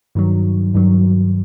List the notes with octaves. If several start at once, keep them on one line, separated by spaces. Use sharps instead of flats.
G2 D#3 F#3
G2 D#3 F#3